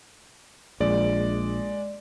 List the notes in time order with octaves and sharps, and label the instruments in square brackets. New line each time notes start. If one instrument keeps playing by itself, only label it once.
[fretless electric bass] A#1 [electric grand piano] G#3 D5